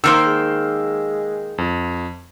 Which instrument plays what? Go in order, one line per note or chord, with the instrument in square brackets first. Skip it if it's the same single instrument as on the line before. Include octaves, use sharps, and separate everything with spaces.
[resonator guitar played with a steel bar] D#3 A#3 C5 [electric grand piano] E6
[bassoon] G#3
[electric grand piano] F2